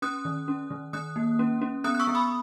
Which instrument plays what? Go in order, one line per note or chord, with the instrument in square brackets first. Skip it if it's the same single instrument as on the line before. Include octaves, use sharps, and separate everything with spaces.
[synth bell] C#4 D#6 F#6
D#3
C#4
D#3
D#3 D#6 F#6
A#3
C#4
C#4
B3 D#6 F#6
F#6
C#6 E6
B3
B5 D#6